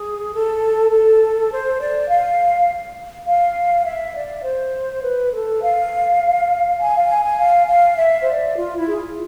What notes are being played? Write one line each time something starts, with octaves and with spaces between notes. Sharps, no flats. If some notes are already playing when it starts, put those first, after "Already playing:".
Already playing: G#4
A4
A4
C5
D5
F5
F5
E5
D5
C5
B4
A4
F5
G#5
F5
G#5
G#5
F5
F5
E5
C5
D5
F4
E4
G#4
F4